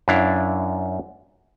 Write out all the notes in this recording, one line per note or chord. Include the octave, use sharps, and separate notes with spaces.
F#2 D4 E4 F5